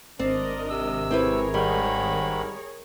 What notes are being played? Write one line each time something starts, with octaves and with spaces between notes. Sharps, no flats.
G#1 C4 D4 A#4 D5 D#5
C3 E6
C4 E4 G#4 A#4 B4 C#5
G#2 D#3 G3 B5